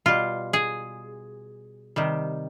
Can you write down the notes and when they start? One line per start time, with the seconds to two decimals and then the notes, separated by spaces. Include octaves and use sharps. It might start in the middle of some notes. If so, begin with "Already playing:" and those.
0.06 B2 G3 F4
0.53 G#4
1.96 C3 D#3 G3